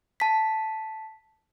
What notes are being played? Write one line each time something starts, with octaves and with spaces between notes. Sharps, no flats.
A5 B6